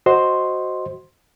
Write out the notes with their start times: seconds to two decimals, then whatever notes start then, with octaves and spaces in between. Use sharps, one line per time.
0.06 F#4 C5 D#5 C6